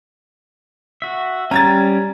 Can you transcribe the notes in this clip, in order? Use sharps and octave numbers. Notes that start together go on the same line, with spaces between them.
F#4 E5
G3 C#4 A#5 G#6 A6